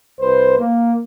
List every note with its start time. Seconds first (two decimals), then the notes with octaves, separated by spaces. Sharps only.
0.20 C2 B4 C5
0.59 A#3